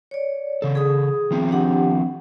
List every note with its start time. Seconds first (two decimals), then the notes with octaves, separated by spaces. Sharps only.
0.11 C#5 D5
0.62 C#3 A4
0.75 G#4 D#6
1.31 D#3 F3 C4
1.52 D4 G4 F#5